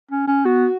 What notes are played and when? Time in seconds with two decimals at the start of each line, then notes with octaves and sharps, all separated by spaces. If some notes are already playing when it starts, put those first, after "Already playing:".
0.11 C#4
0.27 C#4
0.45 B3 F#4